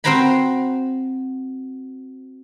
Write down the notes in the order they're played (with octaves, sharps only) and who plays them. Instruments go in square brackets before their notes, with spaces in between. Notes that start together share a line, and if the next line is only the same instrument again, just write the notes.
[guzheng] C4 F#4 C5 G5 A#5 B5